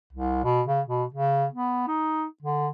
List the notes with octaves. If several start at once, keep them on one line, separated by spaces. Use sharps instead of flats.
C2
B2
C#3
B2
C#3
B3
D#4
D3